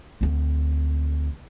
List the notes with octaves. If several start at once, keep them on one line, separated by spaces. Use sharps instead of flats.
D2 C4